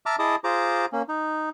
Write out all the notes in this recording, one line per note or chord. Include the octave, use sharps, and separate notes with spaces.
E5 A5 A#5 D6 F6
E4 G#4 D#5 A5 D6 D#6
F4 G#4 C5 A#5 D6
A#3 C#4
D#4